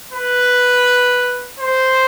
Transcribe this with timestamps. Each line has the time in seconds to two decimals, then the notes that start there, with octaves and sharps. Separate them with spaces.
0.13 B4
1.60 C5